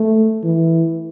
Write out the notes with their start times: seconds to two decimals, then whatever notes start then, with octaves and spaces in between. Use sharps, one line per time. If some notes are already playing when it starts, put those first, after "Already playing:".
Already playing: A3
0.43 E3